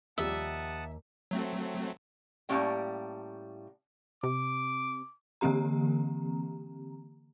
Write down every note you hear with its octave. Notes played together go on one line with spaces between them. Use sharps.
D#2 F3 G3 G4 E5 F#5 A5 D#6
F#3 A3 C4
A2 G3 A#3 C#4 G5
C3 D6
D3 E3 A#3 C4 G4 A#5